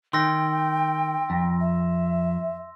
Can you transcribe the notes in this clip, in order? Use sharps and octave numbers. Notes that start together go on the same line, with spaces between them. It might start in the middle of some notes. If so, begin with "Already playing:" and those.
D#3 G5 C6 E6 A#6
F2
E5